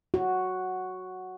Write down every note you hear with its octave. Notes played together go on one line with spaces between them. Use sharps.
F#4